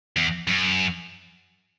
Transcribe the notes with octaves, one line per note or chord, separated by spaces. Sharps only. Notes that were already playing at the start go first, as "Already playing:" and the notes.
E2
F#2